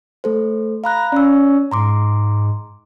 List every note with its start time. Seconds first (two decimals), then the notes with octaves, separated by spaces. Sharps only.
0.24 A3 A4 C5
0.84 F5 A#5 B5 F#6
1.12 C#4 D5 E6
1.71 G#2 A#5 C6 D6